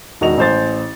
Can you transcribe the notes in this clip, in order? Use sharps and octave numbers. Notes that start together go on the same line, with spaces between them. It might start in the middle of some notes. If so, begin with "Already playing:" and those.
E1 D#3 F#4 D#5 F7
A1 C5 A6